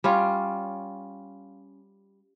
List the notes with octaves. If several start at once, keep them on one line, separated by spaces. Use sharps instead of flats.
G3 C#4 F4